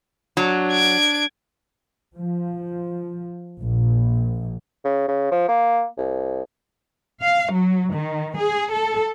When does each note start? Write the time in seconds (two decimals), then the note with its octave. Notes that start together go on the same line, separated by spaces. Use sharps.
0.37 F#3 D4
0.72 G#6 D7
2.15 F3
3.61 A#1
4.85 C#3
5.08 C#3
5.32 F3
5.49 A#3
5.97 C2
7.21 F5
7.52 F#3
7.94 D#3
8.39 G#4
8.72 A4